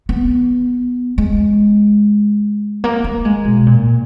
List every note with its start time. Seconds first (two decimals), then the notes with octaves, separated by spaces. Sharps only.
0.09 B3
1.18 G#3
2.84 A#3
3.04 A#3
3.25 G#3
3.45 B2
3.66 A#2